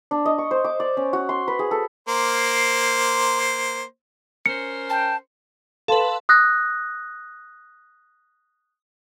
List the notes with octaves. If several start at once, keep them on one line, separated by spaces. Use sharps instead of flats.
D4
D#5
C#6
C5
D6
D5
C#4
F#4
C6
B4
G#4
A4
A#3 C5
C#4 A#4 C5 C#7
G5 A5
A4 B4 F5 A5 C6
D#6 F#6 A#6